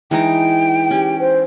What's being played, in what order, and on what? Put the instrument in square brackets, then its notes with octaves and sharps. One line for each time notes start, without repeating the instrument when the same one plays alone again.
[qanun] E3 G#3 D#4 [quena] G5
[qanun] C#4 [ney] G4
[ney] C5